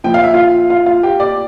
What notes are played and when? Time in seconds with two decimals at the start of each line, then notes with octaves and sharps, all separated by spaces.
0.04 A#2 F3 G5
0.14 F5
0.24 E5
0.33 F4 F5
0.70 F4 F5
0.86 F4 F5
1.03 G4 G5
1.20 D5 D6